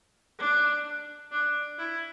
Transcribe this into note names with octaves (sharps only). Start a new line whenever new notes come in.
D4
D4
E4